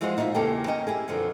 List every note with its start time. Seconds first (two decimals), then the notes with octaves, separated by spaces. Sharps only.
0.01 E3 F3 G#3 F4 F#4 C5
0.17 A#2 D#4 F4 A#4 E5
0.34 E2 C#3 A#3 G4 A4 G5
0.67 A#3 C#4 D#5 G5
0.87 E4 G4 G#4
1.08 F#2 B2 D3 F3